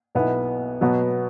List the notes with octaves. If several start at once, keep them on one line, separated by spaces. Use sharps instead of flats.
B1 B2 B3 E4
B2 F#3 B3